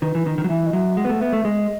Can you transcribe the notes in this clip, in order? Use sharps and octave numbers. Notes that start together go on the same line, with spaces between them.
D#3 B4
E3
D#3
D#3
F#3
E3 E5
D#5
F#3 E5
G#3 F#5
B3
A3
B3 E5
A3
G#3 D#5